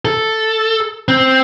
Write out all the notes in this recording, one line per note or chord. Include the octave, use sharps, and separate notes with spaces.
A4
C4